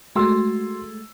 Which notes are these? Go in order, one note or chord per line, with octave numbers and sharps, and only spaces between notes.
G#3 A3 F#4 C6 E6